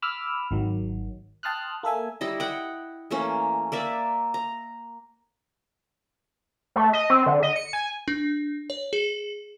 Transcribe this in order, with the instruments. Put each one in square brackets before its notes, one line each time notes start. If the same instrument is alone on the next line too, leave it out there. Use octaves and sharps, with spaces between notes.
[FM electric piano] B5 D6 E6 F6
G#1 D#3 F#3
G5 A5 C6 D#6 F6 F#6
A#3 A4 E5 G#5
[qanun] G3 E4 D#5
F#5 G5
E3 A3 A#3 C#4
A#3 D5 E5
A#5
[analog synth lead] A3
D#5
C4
D3
D#5
C#7
G#5
[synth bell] D4
C#5
G#4